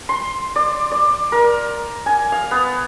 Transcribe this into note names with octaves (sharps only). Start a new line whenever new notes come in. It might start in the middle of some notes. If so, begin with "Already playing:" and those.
C6
D5
D5
A#4
G#5
F5
B3